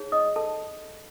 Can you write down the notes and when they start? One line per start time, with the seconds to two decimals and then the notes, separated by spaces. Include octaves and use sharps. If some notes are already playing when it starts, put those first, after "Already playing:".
Already playing: D#4 G#4 C#5
0.12 D#5 D#6
0.36 A4 A5